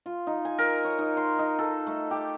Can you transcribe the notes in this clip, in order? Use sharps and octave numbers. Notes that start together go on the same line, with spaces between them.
F4
D#4
G#5
A#4
C#5
D#4
C6
D#4
A4
A3
G4